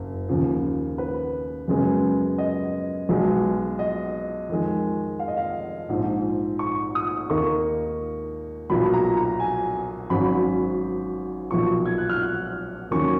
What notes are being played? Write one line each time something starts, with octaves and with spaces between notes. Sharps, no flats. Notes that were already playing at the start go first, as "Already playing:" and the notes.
Already playing: F#1
D#2 C#3 F3
B4
F#2 C#3 G#3 B3
D#5
B1 B2 G#3
D#5
F2 D#3 G#3
F5
D#5
F5
A#1 G#2 F3
C#6
D#6
D#2 D#3 A#3 D#4 C#6
B1 A#2 F#3 B5
A#5
A#5
G#5
G#1 G#2 F#3 C#4 B5
B1 A#2 F3 C#6
G#6
F#6
F6
F#6
D#2 D#3 F#3 C#4 C#6